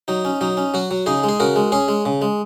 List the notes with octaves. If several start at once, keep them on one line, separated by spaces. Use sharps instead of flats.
F#3 D#4
C#4
F#3 D#4
C#4
F#3 F#4
F#3
C#3 D#4 G#4
G#3
G#4
C#3 F#4 A#4
G#3
C#4 G#4 C#5
G#3
C#3
G#3